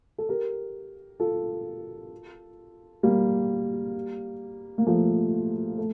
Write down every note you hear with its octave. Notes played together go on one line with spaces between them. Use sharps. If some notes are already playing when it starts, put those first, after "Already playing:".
A4
G4 A#4
F4 A4
G3 A#3
A#3
F3 A3
A3